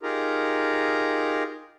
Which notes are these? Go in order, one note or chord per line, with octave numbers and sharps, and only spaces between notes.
D#4 F4 G4 G#4 A#4 A#5